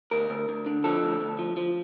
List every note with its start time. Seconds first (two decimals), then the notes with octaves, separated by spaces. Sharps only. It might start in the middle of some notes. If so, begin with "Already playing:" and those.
0.11 D2 A#4
0.30 D2
0.49 D2
0.66 D3
0.84 F3 A4
1.03 D2
1.21 D2
1.39 F3
1.57 F3